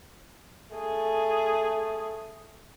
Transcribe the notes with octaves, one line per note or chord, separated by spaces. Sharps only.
A3 G#4